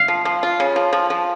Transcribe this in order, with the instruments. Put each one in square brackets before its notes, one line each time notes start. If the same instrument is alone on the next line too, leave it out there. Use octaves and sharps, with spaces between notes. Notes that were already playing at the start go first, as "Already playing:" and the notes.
Already playing: [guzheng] F5
[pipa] F3
F3
F4
C#3
F3
F3
F3